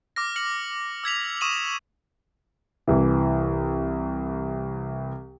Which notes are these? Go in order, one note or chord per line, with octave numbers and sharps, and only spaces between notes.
D6 F6 A#6
F6 C#7 F#7
E6 G#6 B6 F7
C#6 D#6 D#7 E7 F#7
C2 E3